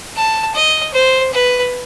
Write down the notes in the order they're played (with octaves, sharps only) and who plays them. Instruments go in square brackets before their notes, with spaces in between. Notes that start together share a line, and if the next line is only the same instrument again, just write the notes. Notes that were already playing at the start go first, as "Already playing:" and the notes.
[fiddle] A5
D#5
C5
B4